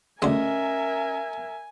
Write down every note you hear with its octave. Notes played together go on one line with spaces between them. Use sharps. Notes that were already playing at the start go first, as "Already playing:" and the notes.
D2 G#3 C#4 A#4 D#5 E5 G#5